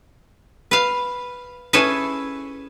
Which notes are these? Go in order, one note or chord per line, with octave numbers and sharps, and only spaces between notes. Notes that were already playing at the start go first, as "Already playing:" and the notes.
B4 F5
C#4 E4 G#4 A4 B4